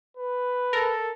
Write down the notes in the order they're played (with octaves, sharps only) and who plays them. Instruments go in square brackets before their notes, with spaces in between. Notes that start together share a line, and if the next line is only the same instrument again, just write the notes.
[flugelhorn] B4
[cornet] A4 [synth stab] A#4